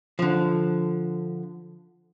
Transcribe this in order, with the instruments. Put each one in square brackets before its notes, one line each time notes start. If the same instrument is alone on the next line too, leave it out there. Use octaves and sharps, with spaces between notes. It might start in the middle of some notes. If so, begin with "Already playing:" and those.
[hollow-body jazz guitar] D3 F3